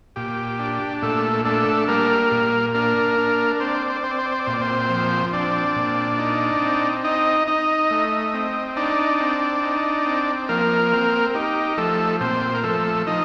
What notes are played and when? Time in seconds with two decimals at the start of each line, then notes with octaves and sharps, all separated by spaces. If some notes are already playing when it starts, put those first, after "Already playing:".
0.16 A#2 G4
0.59 D4
1.02 A#2 A3 A4
1.45 A3 D4 A4
1.88 G3 A#3 A#4
2.31 A#2
2.74 A#3 D4 A#4
3.18 D4
3.60 C4 C5
3.67 D5
3.75 C5
3.83 D5
3.90 C5
3.96 D5
4.03 C4 C5
4.11 D5
4.19 C5
4.26 D5
4.32 C5
4.39 D5
4.46 A#2 C5
4.54 D5
4.61 C4 C5
4.89 F3
5.33 C4 D4 D5
5.76 A#2
6.18 D#4
6.61 C4
7.04 D#4 D#5
7.48 D#4 D#5
7.91 A3
8.34 C4
8.76 D4 D#4 D5
9.20 C4
9.63 D#4
10.06 C4
10.49 F3 A#3 A#4
10.92 C4
11.35 D#4 G4
11.77 F3 A3 A4
12.21 A#2 C4 C5
12.54 A#4
12.63 F3 A3 A4
13.07 F3 D#4 D#5